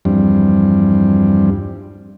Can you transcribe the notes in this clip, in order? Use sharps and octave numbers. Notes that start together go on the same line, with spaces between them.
E2 G2 F3 G3 C4 D4